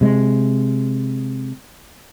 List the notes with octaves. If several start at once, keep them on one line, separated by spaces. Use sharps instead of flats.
C3 G#3